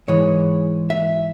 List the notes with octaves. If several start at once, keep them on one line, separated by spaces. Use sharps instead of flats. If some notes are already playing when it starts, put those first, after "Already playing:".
G#2 E3 G#3 C#5
E5